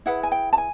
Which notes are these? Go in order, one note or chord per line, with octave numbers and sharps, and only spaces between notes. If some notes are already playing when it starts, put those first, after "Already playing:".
E4 G#4 B4 F#5
G#5
G5
A5
G#5